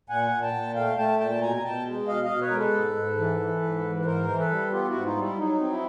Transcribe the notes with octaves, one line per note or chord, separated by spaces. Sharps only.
A#2 F#5 G#5
A#2
G5 A5
A#2
A3 F5 G5
A3 G5 A5
A#2 G5 A5
A5
B2 G#5 A#5
A#5
B2 G5 A5
G#3
B2 D#5 F5
D#5 F5
B2
B4 C#5
G#3 A#4
A4 B4
G#2
G#2
E3
E3
G#2
E3
B4
G#2 A#4 C5
E3
A4 B4
G3
B3 F4 G4
E4 F#4
G#2
D#4 F4
G3
E4
F#3 D#4
C4
E4